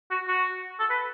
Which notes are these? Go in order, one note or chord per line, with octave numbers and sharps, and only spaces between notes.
F#4
F#4
A4
B4